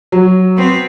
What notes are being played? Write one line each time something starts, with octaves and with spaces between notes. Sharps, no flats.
F#3
B3 C4